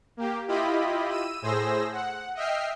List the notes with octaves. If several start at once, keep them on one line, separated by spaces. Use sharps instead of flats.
A#3 G4
E4 F4 G4 D#5 B5
E6 D#7
A2 G#4 C5 E6 A#6
F#5
D#5 E5 G5 F6 C7